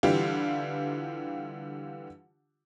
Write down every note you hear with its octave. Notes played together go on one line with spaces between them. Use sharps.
D3 E3 G3 F4 G4